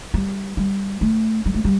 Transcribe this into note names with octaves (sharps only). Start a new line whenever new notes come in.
G3
G3
A3
G3
A3
G3